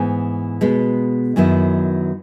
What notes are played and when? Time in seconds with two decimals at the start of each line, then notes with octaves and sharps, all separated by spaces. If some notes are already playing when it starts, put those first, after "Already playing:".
Already playing: G#2 E3 B3
0.61 B2 G#3 B3
1.36 F#2 D#3 F#3 B3 E4